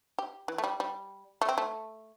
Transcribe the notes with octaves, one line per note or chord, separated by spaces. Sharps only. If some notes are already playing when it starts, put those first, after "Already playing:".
G4
E3
A3
G3
G3
A3
C4
A3